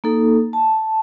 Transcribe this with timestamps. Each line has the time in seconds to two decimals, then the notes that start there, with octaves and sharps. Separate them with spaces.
0.04 A#3 D#4 A4
0.53 A5